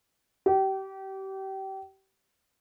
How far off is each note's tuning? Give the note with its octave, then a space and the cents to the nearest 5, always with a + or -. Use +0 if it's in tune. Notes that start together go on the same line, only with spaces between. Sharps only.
G4 -30